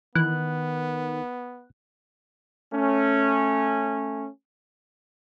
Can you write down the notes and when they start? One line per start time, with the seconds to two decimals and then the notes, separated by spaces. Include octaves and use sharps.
0.15 D#3 E3 B3 F#6
2.73 A3 C#4